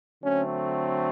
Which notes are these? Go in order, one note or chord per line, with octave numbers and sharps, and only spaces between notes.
D3 F#3 A3 C4 C#4